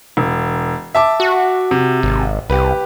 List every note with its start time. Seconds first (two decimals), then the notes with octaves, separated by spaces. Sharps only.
0.17 E1
0.95 E5 A5 D6
1.20 F#4
1.71 C3
2.03 G#1
2.50 C2 G4 B4